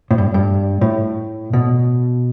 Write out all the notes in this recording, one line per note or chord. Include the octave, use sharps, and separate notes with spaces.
A2
G2
G2
A2
B2